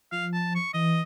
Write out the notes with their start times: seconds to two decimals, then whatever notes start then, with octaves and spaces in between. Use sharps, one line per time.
0.12 F3 F5
0.33 A5
0.55 C#6
0.74 E3 D#5